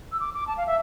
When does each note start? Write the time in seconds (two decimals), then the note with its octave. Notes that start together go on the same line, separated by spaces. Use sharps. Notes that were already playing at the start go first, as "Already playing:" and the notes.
0.12 E6
0.20 D6
0.34 D6
0.47 A5
0.57 F5
0.67 E5